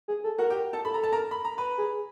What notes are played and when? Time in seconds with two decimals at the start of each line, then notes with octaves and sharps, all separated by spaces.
0.08 G#4
0.24 A4
0.38 F#4 A#4 F#5
0.50 G4 G5
0.73 A4 A5
0.85 A4 B5
0.94 A#5
1.03 A5
1.13 A#4 A#5
1.31 B5
1.45 A#5
1.58 B4 B5
1.78 G#4